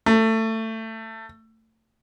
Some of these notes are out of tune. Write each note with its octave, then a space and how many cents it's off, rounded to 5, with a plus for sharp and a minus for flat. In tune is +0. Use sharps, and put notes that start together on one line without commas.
A3 +20